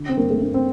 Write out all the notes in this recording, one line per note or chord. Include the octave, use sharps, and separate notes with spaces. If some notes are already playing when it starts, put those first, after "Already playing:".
Already playing: D3
C4
G2 A#3
A3
G2 A#3
C4